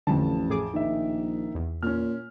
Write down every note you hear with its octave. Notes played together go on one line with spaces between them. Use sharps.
A1 F2 D3 A5
A2 G#4 D6
A#1 D#3 D#4 E5
E2
A#2 C#4 F6